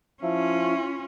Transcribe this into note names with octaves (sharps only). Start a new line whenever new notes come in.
F3 C#4 E4 F4